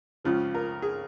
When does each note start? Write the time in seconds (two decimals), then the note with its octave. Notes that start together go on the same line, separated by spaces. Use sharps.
0.24 C#2 C#3 F3 F4
0.54 A#4
0.82 G#4